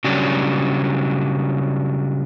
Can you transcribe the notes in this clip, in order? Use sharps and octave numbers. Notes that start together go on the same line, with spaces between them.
C#3 F#3 G3 D4